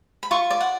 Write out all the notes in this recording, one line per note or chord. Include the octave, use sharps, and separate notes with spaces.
B5
F4 C#6
D5
F#5